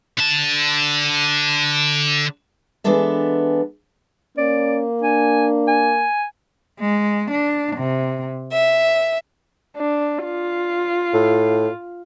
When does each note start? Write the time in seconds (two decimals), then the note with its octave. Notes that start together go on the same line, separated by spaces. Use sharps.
0.18 D3 A5
2.84 E3 G#3 B3 D4 A4 E5
4.38 A#3 C#4 D5
5.03 D4 G#5
5.68 G#5
6.80 G#3
7.31 D4
7.77 C3
8.52 E5
9.77 D4
10.25 F4
11.14 A2